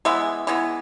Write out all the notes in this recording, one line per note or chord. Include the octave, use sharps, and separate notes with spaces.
E3 G#3 B3 E5
E3 G#3 B3